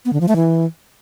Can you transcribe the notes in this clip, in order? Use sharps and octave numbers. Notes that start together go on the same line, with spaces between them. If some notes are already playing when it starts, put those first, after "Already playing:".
B3
D3
F3
A3
E3